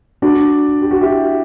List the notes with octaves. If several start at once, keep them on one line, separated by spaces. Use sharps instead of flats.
D4 F#4
G4
F#4
E4 G4